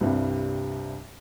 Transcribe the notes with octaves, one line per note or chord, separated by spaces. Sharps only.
C2 G2 C3 G3